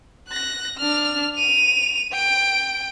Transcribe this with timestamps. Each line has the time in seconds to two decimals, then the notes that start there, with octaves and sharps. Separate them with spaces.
0.29 F#6 A#6
0.78 D4 F6
1.35 D#7 F7
2.12 G5 D7